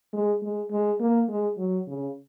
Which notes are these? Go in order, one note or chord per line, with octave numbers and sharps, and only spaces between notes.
G#3
G#3
G#3
A#3
G#3
F#3
C#3